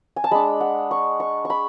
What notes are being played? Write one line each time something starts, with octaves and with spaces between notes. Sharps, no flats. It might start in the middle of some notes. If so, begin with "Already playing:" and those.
G#5
A5
G#3 D4 B5
F#5
C#6
C#6
C#6
B5